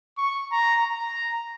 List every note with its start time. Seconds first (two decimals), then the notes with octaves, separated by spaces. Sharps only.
0.18 C#6
0.52 A#5
0.85 A#5